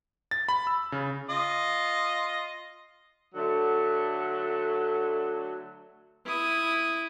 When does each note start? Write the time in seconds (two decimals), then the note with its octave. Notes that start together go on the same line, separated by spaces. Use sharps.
0.31 A6
0.49 B5
0.67 E6
0.92 C#3
1.29 F4 D#5
3.35 D3 F#3 A3
6.26 E4 D#6